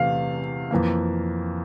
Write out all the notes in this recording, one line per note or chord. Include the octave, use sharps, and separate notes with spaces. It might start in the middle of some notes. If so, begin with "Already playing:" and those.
Already playing: E2 C3 E3 A3 F5
F2 E3 A#3